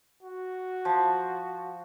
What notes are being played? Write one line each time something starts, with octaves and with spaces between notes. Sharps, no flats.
F#4
F3